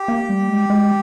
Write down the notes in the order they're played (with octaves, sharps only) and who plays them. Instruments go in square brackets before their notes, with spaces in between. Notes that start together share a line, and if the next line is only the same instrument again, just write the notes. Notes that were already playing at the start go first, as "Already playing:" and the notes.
Already playing: [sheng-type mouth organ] G4
[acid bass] A#3
G3
G#3
G#3